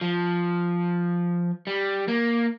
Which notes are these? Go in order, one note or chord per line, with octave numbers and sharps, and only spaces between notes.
F3
G3
A#3